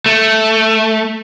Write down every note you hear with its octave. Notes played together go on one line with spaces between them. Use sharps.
A3